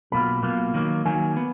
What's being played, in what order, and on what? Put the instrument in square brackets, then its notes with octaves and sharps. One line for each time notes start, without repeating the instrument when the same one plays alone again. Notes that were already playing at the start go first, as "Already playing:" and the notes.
[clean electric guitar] B1 B2 A#3 F4 [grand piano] B5
[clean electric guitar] B1 B2 A#3 F4
D#3 F#3 A#3
[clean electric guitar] D#3 F#3 A#3 [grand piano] G#5
[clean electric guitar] B3